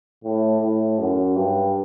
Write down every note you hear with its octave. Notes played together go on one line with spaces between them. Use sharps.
A2
A2
F#2
G2